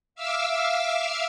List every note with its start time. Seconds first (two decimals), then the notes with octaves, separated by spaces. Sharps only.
0.15 E5 F5 D6 E6 F6